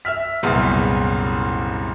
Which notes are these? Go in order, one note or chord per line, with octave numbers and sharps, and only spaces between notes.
E5 E6 F6 B6
C2 F#2 A#2 C#3 B3